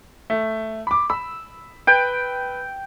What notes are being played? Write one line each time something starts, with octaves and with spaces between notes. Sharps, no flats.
A3
B5 D6
B5 E6
B4 G5